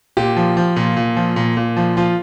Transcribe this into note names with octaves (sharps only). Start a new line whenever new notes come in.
A#2 G4
F3
F3
A#2
A#2
F3
A#2
A#2
F3
F3 F4